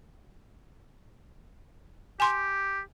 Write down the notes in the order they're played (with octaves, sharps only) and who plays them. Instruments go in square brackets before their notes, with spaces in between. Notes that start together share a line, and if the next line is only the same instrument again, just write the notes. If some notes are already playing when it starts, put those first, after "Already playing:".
[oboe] G4 [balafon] G#5 C6